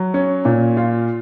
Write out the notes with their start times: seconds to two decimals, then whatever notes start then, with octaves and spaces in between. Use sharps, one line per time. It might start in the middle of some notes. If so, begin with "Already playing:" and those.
Already playing: F#3
0.14 C#4
0.45 A#2
0.77 F4